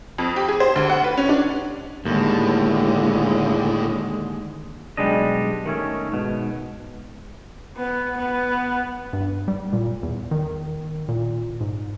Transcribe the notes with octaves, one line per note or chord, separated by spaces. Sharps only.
F2
G4
G#4
C5
D2
F#5
B4
C#4
D4
D#2 A2 D3 G#3
B1 G#2 G3 G#3 D4 D#5
D#3 A3 C#4
G#2 B2
B3
B3
G2
G3
A#2
E2
D#3
A#2
G#2